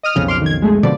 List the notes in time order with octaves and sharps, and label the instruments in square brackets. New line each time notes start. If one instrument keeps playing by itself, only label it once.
[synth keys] D#5 D#6 F6
[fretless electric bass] B1 F2 C#3
[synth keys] C6 D6 F6
D#3 G#6
G#3 A3 G#4
[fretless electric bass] B2 D3 F3 [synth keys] D5